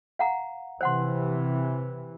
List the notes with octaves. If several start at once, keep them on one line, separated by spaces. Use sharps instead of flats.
F5 F#5 A#5
C3 E3 C5 F#5 C6